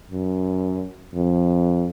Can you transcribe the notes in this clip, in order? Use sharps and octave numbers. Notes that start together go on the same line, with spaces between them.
F#2
F2